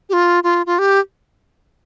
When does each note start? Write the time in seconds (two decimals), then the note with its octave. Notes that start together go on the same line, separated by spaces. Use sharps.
0.09 G4
0.13 F4
0.44 F4
0.66 F4
0.79 G4